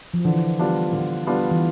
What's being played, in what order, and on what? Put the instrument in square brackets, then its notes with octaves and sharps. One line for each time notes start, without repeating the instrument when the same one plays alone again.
[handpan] F3
[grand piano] D3 [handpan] E3
[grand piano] G3 B3 D4 F4
D3
G3 B3 D4 F4
[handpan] E3